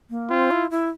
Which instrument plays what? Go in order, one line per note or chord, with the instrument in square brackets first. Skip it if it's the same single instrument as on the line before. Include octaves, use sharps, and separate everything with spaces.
[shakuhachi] A#3
[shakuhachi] C4 [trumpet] F4
[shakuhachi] E4
E4